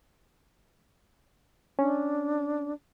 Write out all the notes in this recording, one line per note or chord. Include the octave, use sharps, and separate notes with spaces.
C#4 D4